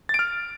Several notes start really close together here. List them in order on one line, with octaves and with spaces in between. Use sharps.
A6 D7 F6